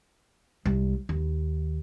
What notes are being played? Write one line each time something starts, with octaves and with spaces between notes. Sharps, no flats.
C2
D#2